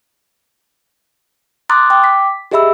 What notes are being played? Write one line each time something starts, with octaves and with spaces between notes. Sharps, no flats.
A#5 C6 D6 D#6 F#6 A6
G5 D6
B6
G4 G#4 D#5 E5 B5 E6